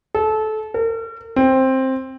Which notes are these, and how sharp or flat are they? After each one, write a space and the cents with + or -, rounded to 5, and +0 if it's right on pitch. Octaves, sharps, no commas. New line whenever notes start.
A4 -25
A#4 -45
C4 +10